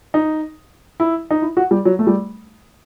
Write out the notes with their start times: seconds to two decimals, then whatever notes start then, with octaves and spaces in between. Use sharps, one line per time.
0.14 D#4
1.00 E4
1.30 D#4
1.42 E4
1.57 F#4
1.71 G3
1.85 F#3
1.99 A3
2.07 G3